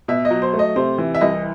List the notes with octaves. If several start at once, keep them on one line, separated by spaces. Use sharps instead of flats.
B2 E5
D#5
F#3
C5
A3
D#5
C3 C5
E3
E5
C2 D#5